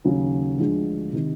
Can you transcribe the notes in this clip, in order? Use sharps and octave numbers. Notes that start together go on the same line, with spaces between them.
D#2 C#3 F#3
D2 D3 F3 G#3
C3 D#3